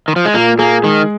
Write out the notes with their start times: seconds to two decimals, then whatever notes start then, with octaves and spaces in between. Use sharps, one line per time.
0.08 D#3
0.16 F3
0.25 G#3
0.34 A#2 A#3
0.59 A#3 G#4
0.83 D#3 G#3